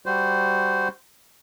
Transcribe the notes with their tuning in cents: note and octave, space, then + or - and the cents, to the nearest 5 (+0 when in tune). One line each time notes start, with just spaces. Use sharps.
G3 +0 F#4 +0 C5 -15